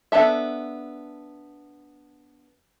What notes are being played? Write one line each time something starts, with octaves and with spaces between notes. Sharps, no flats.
B3 D4 A4 E5